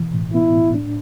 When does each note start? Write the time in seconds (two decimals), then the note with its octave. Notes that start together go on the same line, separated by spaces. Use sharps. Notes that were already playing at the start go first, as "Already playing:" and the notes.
Already playing: B2 E3
0.14 A2
0.34 B3 E4
0.55 A2
0.74 D4